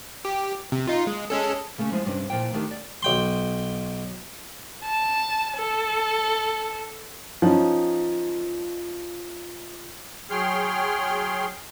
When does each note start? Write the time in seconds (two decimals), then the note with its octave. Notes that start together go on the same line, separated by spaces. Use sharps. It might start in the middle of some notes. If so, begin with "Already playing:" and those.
0.25 G4
0.72 C3
0.87 D#4 F4
1.07 G#3
1.30 G#3 C#4 A4
1.78 C#3 A3 A#3 C#4
1.92 F3 G#3 E4 E5
2.05 G2 C3 C#4 D4
2.30 A#2 F3 E4 G5
2.53 D#3 A3 D4 D#4 G4 A#4
2.71 D5
3.03 B1 G5 C6
4.85 A5
5.57 A4
7.42 F3 C#4 D#4
10.30 F#3 G#4 C#5 G5 C6 F6